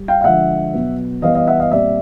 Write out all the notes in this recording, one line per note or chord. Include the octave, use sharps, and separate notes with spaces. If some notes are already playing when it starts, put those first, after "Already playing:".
Already playing: G3
F5 G5
F5
D3 F3 G#3 E5 F#5
B2 F#3 B3
E3 G3 B3 D#5 F5
D#5 F5
E5 F#5
D#5 F5
A#2 G3 C4 D5 E5